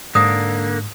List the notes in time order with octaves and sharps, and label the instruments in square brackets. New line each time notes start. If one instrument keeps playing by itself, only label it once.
[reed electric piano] G#2 [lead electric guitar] D3 A#3 [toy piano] D#6